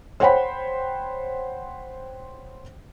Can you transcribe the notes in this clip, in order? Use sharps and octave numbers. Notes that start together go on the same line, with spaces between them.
C5 C#5 F#5 G5 B5